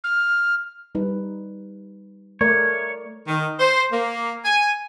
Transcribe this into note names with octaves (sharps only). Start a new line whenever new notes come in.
F6
G3 D#4 B4
A3 A#4 C#5 D5
D#3
C5
A#3
G#5